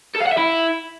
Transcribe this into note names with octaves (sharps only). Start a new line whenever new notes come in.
A4
F5
F#5
E5
E4